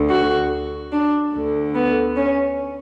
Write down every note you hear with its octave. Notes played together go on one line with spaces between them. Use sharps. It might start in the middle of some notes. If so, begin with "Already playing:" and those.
Already playing: D2 D3
F#4
D4
D2 D3
B3
C#4